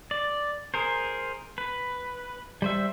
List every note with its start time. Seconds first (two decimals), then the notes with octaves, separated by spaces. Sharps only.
0.11 D5
0.74 G#4 A#4 C5
1.58 B4
2.62 G3 C5 E5